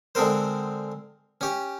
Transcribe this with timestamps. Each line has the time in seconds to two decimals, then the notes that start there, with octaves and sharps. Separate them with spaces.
0.15 D3 G#3 C4 A#4 C5
1.41 C#4 G4